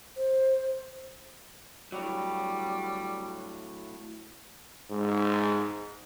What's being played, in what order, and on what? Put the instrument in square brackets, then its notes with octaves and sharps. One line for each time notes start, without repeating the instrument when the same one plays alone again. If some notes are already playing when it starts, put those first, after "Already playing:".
[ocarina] C5
[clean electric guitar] A2 F#3 [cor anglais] G3
[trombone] G#2